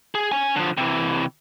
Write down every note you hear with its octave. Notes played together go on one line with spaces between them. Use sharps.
G#4
C#4 G#5
D3 F3
C3 E3